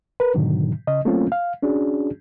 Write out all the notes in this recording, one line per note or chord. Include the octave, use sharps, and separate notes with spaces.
A#4 B4
G#2 B2 D3 D#3 F#3
C#3 D#5
F#3 A3 A#3 C4 C#4 F4
F5
C#4 D4 F#4 G#4